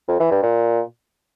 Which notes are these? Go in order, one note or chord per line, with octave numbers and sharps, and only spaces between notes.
F2
E3
G2
A#2